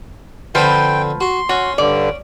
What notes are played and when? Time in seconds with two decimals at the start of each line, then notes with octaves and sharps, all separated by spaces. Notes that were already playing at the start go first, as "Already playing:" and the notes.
0.55 D3 F3 C4 B4 C5 G5
1.21 F#4 C6
1.49 C#4 F#4
1.78 G2 D3 D5